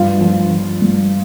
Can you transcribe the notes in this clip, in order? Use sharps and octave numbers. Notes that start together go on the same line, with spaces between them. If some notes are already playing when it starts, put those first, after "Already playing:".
Already playing: G2 F3 F4
F3
F3
G2